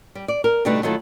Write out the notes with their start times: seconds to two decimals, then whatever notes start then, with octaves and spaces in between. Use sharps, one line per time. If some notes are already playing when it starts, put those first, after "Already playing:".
0.15 G3
0.28 D5
0.44 A#4
0.65 B2 D3 G3 A3 D#4 B4
0.83 D#3 F#3 A3 E4 F4 A4